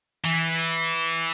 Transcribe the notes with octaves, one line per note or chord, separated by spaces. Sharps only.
E3